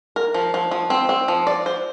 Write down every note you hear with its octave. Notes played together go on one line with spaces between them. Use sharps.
A#4
F3
F3
F3
C4
C4
F3
D5
C5